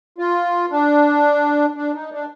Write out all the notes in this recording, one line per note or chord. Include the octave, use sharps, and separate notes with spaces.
F4
D4
D4
D#4
D4